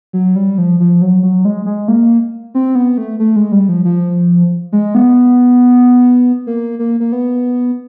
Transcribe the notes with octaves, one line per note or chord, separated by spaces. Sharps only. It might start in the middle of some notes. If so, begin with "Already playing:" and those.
F#3
G3
F3
F3
F#3
F#3
G#3
G#3
A#3
C4
B3
A3
A3
G#3
G3
F3
F3
G#3
B3
A#3
A#3
A#3
B3